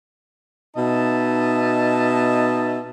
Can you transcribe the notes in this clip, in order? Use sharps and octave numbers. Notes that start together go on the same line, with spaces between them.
B2 D#4 D#5 E5 A5